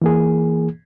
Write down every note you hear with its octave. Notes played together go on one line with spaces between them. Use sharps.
E3 A#3 G#4